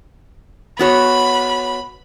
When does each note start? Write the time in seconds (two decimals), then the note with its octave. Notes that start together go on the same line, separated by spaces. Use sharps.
0.79 B3 F#4 C#5 B5